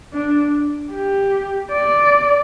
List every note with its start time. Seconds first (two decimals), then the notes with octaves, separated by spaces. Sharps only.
0.13 D4
0.92 G4
1.72 D5